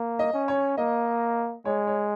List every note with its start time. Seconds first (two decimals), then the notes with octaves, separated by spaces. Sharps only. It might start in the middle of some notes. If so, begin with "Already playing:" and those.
Already playing: A#3
0.19 D#5
0.33 C#4
0.48 C#5
0.77 A#3 D#5
1.65 G#3 C#5
1.87 C#5